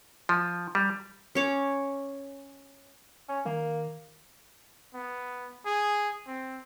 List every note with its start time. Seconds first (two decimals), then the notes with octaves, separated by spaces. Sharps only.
0.29 F3
0.75 G3
1.35 C#4 C#5 D6
3.29 C#4
3.45 D#3 A#3
4.94 B3
5.66 G#4
6.27 C4